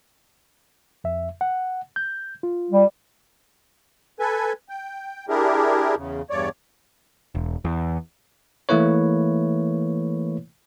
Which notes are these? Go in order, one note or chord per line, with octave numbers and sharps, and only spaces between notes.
F2 E5
F#5
G6
F4
G3
A4 B4 G#5
G5
D4 E4 G4 G#4 A#4
E2 C#3
E2 G2 C#5 D5
E1
E2
E3 A3 A#3 E4 B4 C#5